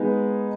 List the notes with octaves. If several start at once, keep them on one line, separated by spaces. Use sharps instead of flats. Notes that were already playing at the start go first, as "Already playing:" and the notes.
Already playing: G#3 B3 D#4